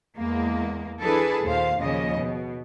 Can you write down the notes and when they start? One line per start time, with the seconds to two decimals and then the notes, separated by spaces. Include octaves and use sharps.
0.15 E2 G#3 A#3
1.00 E3 D4 G#4 A4 B4
1.43 D#2 A#2 C5 F5
1.78 D#2 A#2 C#3 F3 D#5
2.15 B2